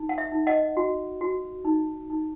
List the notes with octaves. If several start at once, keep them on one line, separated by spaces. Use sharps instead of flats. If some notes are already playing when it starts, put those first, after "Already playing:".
Already playing: D#4
F#5
E5
D#4
D#5 F#5
F#4
F#4
D#4
D#4